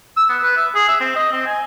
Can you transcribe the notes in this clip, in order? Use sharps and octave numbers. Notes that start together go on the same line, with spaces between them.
E6
B3
B4
E5
G#4
E5
C4
D#5
C4
G#5